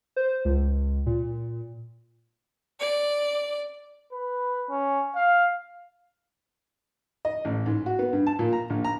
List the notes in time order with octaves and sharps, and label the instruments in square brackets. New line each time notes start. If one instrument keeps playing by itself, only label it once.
[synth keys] C5
C#2
A#2
[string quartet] D5
[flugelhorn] B4
C#4
F5
[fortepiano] D#5
A1
G#2
F#4
B3
G2
A5
A#2
A#5
A#1
A#5